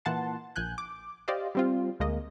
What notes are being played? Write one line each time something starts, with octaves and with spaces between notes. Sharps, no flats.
A#2 E3 F#5 A5 C6
A#1 G#5 F#6 G6
D6
G4 C5 D5 D#5 F5
G3 C4 F4
D2 G#3 A#3 D#5